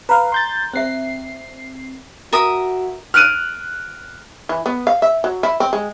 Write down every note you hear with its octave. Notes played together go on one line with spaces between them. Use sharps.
B4 F5 A#5
C6 G6 A6
C4 C5 E5 C7
F#4 A#4 E5 D#6
F6 F#6 D7 D#7
E3
B3
F5
E5
F#3
E4
C4
G#3